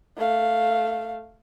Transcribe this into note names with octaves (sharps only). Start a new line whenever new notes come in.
A3 F5